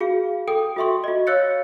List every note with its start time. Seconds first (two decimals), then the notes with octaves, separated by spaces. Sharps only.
0.01 F#4 G#4 F5
0.48 A4 G5 D#6
0.76 F#4 A4 E5 C6 C#6
1.04 F#4 D#5
1.27 C#5 F5 E6 F#6 A6 C#7